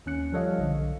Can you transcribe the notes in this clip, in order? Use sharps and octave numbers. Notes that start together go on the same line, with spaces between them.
D#2 C#4 F#6 C#7
F3 G3 A4 C#5 D#5 F5
B1 D3